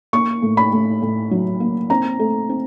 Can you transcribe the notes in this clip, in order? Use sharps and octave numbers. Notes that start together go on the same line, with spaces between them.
A#3 C#6
A2
B5
A2
A2
F#3
A#3
C4 A#5
A3
C4